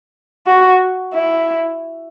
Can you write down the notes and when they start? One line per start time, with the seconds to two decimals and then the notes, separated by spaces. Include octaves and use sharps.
0.47 F#4
1.14 E4